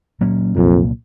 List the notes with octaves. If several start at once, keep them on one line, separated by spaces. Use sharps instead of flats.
A#2 F#3 A#3 C#4
C2 F2 A#2 F#3 A#3